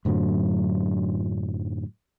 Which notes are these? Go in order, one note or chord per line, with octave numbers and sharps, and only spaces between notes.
F#2 A2 D3 F#3